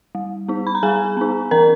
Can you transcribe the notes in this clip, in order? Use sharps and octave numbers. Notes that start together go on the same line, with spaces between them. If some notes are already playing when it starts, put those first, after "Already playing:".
G3
B3 D#4
B5
A#5
G3 G#4 G#5
B3 D#4
E3 A#4 A#5